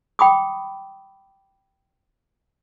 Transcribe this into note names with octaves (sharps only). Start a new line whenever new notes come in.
G5 B5 D6 D#6